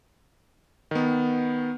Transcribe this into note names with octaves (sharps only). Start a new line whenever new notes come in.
D#3 B3